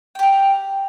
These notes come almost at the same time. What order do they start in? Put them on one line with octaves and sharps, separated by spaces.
G5 G4 A#4